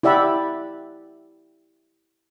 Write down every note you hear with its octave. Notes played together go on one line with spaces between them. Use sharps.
E4 G4 D5 E5 F#5 B5